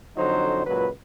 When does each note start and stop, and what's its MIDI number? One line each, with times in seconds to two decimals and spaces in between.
0.17 0.64 41
0.17 0.64 50
0.17 0.64 54
0.17 0.64 63
0.17 0.64 72
0.65 0.89 37
0.65 0.89 46
0.65 0.89 54
0.65 0.89 71